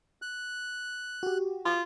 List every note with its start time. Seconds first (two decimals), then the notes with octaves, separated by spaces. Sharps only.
0.22 F#6
1.23 F#4 G4
1.65 F4